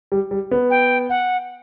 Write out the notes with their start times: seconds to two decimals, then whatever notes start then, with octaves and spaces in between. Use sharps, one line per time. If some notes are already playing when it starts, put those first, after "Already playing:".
0.12 G3
0.31 G3
0.51 B3
0.70 G5
1.10 F#5